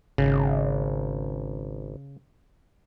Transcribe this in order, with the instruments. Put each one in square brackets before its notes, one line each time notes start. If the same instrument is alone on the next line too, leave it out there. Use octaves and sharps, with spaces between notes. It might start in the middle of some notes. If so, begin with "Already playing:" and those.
[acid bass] G#1 [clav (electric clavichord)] C#3